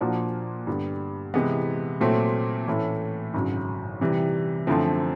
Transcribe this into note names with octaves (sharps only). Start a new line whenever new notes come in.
A#2 F3 A#3 D4 F#4
G2 D3 G3 B3
C3 E3 G#3 B3
A#2 F#3 A3 C4
A2 E3 A3 C#4
G#1 F#2 C#3 F#3
C3 E3 G3
F#2 D3 F3 A3 C4